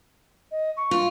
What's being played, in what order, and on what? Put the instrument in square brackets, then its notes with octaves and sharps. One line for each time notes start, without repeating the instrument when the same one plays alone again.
[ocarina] D#5
C#6
[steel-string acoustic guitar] F4